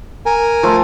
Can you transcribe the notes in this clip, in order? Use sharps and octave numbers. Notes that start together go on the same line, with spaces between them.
A#4 G#5
F3 A3